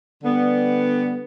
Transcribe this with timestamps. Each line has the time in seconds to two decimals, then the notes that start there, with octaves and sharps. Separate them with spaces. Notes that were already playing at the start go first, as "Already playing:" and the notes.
0.23 D3 G3 B3